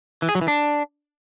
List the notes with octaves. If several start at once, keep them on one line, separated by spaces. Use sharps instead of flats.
E3
G#4
F#3
E3
D4